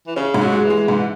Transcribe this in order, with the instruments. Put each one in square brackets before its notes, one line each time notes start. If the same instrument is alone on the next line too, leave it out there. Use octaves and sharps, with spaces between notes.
[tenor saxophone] E3
[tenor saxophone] C#3 [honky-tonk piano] C#4
[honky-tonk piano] G#2
[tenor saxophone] F#3
[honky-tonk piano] G#3
[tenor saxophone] E3
[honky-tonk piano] G#3
[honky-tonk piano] G#2 [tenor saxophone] E3